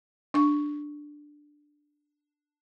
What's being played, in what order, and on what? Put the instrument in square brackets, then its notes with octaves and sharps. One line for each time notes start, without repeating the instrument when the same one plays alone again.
[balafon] D4 C#6